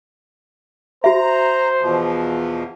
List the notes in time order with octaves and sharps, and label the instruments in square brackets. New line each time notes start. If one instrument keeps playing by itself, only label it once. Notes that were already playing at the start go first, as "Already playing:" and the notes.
[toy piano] F#4 E5 [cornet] C5 [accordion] A#5
[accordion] E2 B2 F3